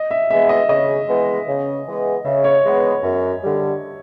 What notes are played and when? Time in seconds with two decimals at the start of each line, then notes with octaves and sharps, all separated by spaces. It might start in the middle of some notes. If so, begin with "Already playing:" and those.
Already playing: D#5
0.11 E5
0.30 E3 G#3 B3 E5
0.49 D#5
0.69 C#3 D#5
1.09 E3 G#3 B3
1.47 C#3
1.86 E3 G#3 B3
2.25 C#3 E5
2.44 C#5
2.63 E3 G#3 B3
3.02 F#2
3.42 D3 G3